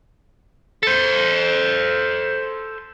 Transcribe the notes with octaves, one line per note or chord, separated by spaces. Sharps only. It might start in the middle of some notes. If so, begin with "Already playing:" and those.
A4 C5